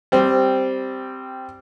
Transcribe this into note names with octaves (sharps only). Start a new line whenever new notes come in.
G3 C4